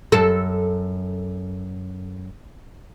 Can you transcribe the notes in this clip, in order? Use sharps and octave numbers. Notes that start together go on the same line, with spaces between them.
F#2 A4